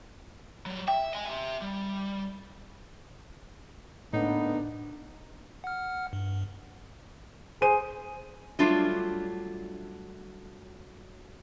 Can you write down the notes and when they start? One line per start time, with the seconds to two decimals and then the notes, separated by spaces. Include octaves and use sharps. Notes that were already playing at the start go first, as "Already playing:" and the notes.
0.66 F#3 G3
0.88 E5 G5
1.13 D#5 G#5
1.26 G4 E5
1.62 G3
4.13 A2 D3 A#3 B3 D4 D#4
5.64 F#5 F6
6.13 G2
7.62 G#4 C5 D#7
8.59 F#3 G3 A3 D4 F4